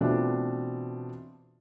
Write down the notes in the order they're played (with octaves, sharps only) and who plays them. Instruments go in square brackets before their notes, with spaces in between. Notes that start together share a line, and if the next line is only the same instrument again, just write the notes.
[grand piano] B2 E3 A3 C4 D4 F4